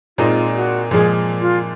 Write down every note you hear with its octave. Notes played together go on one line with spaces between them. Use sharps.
A#2 G#3 C4 D#4 F4
F#4
A#2 F3 G#3 G#4
F4